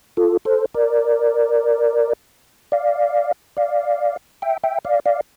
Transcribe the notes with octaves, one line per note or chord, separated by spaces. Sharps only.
F4 A4
A4 C5
A#4 D5
D5 F5
D5 F5
E5 G5
E5 G5
D5 F5
D5 F5